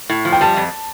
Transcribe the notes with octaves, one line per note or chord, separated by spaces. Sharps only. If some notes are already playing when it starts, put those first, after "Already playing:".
A2
F3
G5
G3 A5
F2